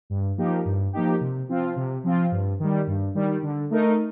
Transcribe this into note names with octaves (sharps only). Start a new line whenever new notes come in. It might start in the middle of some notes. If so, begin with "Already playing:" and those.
G2
F3 A#3 D#4 G4
G2
F3 A#3 D#4 G4
C3
F3 C4 F4
C3
F3 C4 F4
G2
D#3 G3
G2
D#3 G3
D3
A3 D#4 A#4